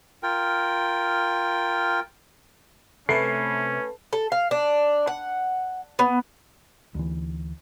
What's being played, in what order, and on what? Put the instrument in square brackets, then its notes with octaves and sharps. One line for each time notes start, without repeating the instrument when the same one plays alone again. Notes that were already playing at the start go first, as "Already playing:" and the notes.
[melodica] F4 A#4 G5
[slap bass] C3 [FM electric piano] A3 B4 A5 [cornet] C#4 [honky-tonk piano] C7
[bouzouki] A4
F5
D4
F#5
B3
[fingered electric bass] D2 E3